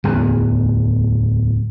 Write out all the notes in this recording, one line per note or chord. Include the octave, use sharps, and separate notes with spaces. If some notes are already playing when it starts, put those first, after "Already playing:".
D1 E2